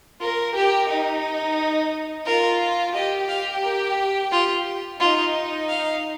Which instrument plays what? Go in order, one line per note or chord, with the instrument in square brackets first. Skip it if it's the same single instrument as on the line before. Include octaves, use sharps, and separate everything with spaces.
[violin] F4 [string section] A#4
[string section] G4 [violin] A#4
[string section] D#4
[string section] F4 [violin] A#4
[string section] G4 [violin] D#5
[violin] F5
A#4
F4
[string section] D#4 [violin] F4
[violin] F5